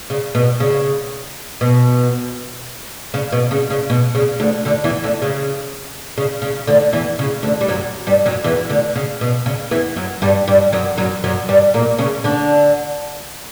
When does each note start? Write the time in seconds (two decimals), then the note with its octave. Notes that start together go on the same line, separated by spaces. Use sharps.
0.10 C#3
0.35 B2
0.60 C#3
1.61 B2
3.14 C#3
3.32 B2
3.51 C#3
3.70 C#3
3.90 B2
4.15 C#3
4.40 D2 D3
4.65 D2 D3
4.84 E2 E3
5.04 D2 D3
5.22 C#3
6.18 C#3
6.42 C#3
6.67 D2 D3
6.93 E2 E3
7.19 C#3
7.43 D2 D3
7.61 G3
7.68 F#2 F#3
8.07 G2 G3
8.26 F#2 F#3
8.44 E2 E3
8.69 D2 D3
8.96 C#3
9.21 B2
9.46 C#3
9.71 E2 E3
9.96 F#2 F#3
10.22 G2 G3
10.48 G2 G3
10.72 F#2 F#3
10.97 F#2 F#3
11.24 F#2 F#3
11.48 G2 G3
11.74 A#2 A#3
11.98 C#3 C#4
12.24 D3 D4